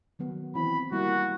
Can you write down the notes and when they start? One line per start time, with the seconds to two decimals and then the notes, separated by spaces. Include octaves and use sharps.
0.19 D#3 F#3 B3
0.55 E3 C4 E4 B5
0.92 G3 A#3 E4 F#4